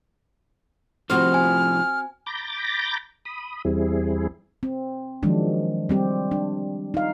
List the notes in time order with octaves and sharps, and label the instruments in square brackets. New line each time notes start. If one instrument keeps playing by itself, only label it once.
[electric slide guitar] A2 C3 F3 [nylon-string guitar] C4 F#4 C5 [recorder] F6
[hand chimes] G#5
[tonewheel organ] A#5 B5 D6 G6 A6 A#6
B5 D#6
E2 G3 C4 E4 G#4
[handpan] C4
D#3 F3 F#3 G#3 D4
G3 C4 G4
D4
D#4 F5